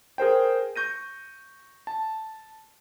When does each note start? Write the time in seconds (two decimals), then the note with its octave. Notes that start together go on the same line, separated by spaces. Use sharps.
0.18 G#4 A#4 C5 G5
0.76 C#6 G6 A#6 D#7
1.87 A5